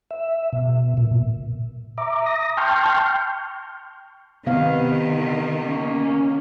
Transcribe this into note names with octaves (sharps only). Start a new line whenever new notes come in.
E5
B2
A#2
E5 A#5 D6
D#6 A#6
G5 A5 C6 C#6 F6 G6
C3 D#3 B3 F5
A#3 C#4